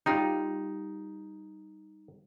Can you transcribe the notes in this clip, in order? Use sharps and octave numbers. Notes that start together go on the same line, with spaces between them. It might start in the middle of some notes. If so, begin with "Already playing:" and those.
G3 D#4 F4